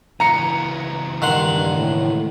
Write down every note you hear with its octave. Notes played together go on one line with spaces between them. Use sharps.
C#2 E3 A#5 C#7
G2 D#3 F#5 C6
A2